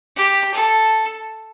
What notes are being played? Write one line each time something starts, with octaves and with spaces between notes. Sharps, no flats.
G4
A4